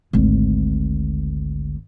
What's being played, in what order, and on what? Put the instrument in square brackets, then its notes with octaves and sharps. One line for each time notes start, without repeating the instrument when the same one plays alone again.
[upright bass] G#1 D2